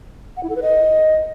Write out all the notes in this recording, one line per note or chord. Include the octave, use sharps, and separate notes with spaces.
F#5
E4
A4
B4
D#5